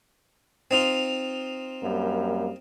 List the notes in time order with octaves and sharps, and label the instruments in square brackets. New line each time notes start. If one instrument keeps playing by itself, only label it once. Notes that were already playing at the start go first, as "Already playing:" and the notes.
[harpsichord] C4 D#4 F4
[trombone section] F#2 G3 A#3